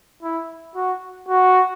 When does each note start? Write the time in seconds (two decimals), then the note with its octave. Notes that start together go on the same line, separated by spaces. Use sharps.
0.23 E4
0.75 F#4
1.29 F#4